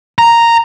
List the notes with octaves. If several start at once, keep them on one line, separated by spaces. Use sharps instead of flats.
A#5